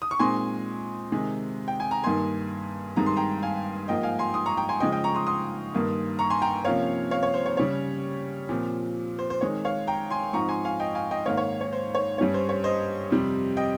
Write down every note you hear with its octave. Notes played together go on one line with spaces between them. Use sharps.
D#6
C#6
A#2 G#3 C4 D#4 G#5 C6
C3 D#3 G#3
G5
G#5
A#5
G2 D#3 A#3 D#4 G#5 C6
G2 D#3 G#3 C4 D#4 A#5
C6
G5 A#5
F5 G#5
G#2 F3 A#3 D#5 G5
F5 G#5
G#5 C6
C6 D#6
A#5 C#6
G5 A#5
G#5 C6
C#3 F3 G#3 D#5 G5
D#5 G5
A#5 C#6
C6 D#6
C6 D#6
G2 D#3 A#3 D#4
A#5 C#6
G#5 C6
G5 A#5
C3 F3 A#3 C#4 C#5 F5
C#5 F5
C#5
C5
C#5
C#3 G3 C#4 C#5
A#2 F3 C4
C5
C5
D#3 G#3 C4 C#5
C#5 F5
G5 A#5
G#5 C6
G#2 F3 C4 D#4 A#5 C#6
G#5 C6
F5 G#5
D#5 G5
F5 G#5
D#5 G5
G#2 D#3 A#3 C#5 F5
C#5
C#5
C5
C#5
G2 G3 C#4 C#5
C5
C#5
C5 D#5
F2 C3 G3
D#5 G5